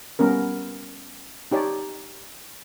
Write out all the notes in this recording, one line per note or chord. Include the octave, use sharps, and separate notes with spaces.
G3 B3 C#4 A#4
D#4 G4 C#5 D5